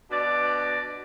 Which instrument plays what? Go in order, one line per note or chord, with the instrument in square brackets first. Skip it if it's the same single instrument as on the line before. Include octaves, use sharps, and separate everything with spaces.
[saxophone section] B2 D4 D5